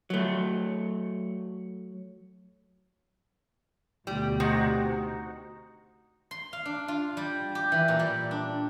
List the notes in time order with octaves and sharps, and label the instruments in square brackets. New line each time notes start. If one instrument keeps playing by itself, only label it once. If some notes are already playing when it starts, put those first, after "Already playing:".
[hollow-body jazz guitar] F#3 A3
[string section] D2 B2 [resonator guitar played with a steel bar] G3
[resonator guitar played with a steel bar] C3 [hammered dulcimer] D#4 F#4
[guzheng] C6
F5
D4
F4
G3
G4
E3
A#2
G3
D4